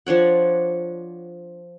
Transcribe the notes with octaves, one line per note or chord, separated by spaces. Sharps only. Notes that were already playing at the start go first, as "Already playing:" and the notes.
F3 D4 C#5 F#5